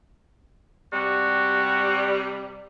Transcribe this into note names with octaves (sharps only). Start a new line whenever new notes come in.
C3 G3 F#4